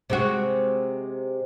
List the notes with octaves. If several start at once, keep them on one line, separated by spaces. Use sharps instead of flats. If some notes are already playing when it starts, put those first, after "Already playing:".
C3 G#3 F#4